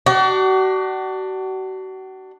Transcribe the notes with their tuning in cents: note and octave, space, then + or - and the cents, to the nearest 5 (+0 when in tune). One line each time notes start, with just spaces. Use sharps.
D4 +15 F#4 +40